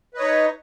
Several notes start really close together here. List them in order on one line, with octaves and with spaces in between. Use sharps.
B4 D#5 C#5 D#4